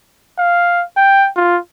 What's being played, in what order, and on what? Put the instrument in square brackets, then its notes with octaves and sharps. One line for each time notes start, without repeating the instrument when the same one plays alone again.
[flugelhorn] F5
G5
F4